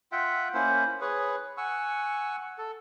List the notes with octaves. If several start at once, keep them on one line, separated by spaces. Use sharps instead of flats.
F4 E5 F#5 G5
A#3 C#4 E4 C5
G#4 B4 C#5
F#5 G#5 C#6 E6
A4